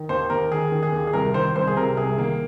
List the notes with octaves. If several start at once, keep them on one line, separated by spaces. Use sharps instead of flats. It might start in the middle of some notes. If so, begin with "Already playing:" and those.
Already playing: D#3
D#2 C5
D#2 A#4
D#3 G#4
D#3
G#4
D#2
G#4
C2 A#4
D#3 C5
C2 C5
G#4
C3 A#4
C2 G#4
D#3 A#3